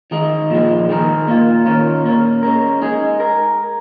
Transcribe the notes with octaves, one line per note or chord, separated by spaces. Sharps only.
D#3 G#3 D#4
A#2 F3 G#3
D#3 G#3 D#4 A#4
A#2 A#3 F4
D#3 C#4 F4 A#4
A#2 A#3 C#4 A#4
G#3 C#4 A#4
G#3 D#4 G#4
A#4